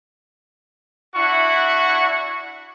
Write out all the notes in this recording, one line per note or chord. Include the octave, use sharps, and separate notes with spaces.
D4 E4 F#4 F#5 C#6